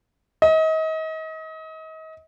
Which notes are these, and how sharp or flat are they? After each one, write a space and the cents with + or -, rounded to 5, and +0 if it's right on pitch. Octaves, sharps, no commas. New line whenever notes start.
D#5 +35